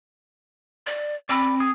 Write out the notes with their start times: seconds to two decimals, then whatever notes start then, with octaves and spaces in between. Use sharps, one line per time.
0.87 D5
1.29 C4 D5 B5
1.60 G#4 D#6